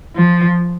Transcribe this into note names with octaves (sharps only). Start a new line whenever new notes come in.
F3